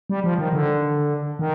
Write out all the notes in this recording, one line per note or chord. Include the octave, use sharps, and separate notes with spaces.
G3
F3
D#3
D3
D#3